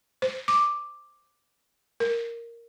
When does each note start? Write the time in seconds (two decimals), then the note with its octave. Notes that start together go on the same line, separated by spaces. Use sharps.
0.22 C5
0.48 D6
2.00 A#4